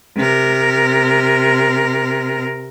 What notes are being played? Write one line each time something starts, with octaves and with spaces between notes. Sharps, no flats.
C3 A#4